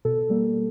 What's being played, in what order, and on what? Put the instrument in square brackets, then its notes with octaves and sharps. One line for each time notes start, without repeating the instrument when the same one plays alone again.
[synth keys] B2 A4
G3 A#3